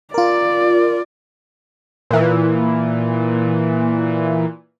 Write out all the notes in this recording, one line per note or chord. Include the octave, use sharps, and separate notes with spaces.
F4 A#4 D5
A#2 E3